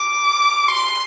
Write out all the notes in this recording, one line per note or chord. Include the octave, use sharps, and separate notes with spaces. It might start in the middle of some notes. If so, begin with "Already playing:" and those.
Already playing: D6
C6